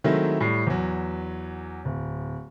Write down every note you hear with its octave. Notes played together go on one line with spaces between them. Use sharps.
D#3 F#3 G#3 A3 C4 E4
A2 G3
E2 F#3
D1